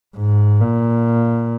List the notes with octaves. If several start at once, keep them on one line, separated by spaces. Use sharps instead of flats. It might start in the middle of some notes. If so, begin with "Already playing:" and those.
G#2
A#2